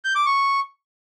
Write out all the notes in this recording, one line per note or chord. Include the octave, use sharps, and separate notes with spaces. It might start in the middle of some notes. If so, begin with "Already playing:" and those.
G6
D6
C#6